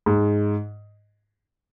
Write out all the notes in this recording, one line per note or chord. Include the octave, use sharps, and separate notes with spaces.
G#2